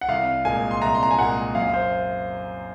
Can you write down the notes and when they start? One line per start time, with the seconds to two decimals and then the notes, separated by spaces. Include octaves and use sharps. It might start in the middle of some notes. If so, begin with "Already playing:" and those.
0.01 F#5
0.09 C2 F5
0.45 A#2 G#3 G#5
0.71 C6
0.82 C2 A#5
0.95 C6
1.03 A#5
1.11 G#5
1.18 A#2 G#3 F#5
1.55 F#2 F5
1.74 C5